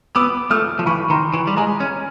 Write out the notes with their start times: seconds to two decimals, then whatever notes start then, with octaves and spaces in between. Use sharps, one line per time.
0.15 B3 D6 E6
0.51 A3 D#6 F6
0.79 F3
0.86 E3 B5 C#6
1.10 D#3 A#5 C6
1.34 E3
1.47 G3
1.57 G#3 G#5 A#5
1.80 C#4